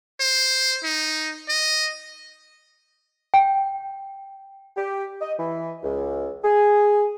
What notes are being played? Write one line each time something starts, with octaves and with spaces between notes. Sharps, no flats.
C5
D#4
D#5
G5
G4
D#5
E3
C#2
G#4